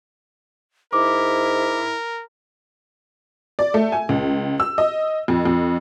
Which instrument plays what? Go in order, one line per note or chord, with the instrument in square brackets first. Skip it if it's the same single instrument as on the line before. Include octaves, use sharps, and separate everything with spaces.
[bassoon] G#2 [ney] E4 [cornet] A#4 [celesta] D6
[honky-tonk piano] D5
A3
G#5
C#2
E6
D#5
F2
F2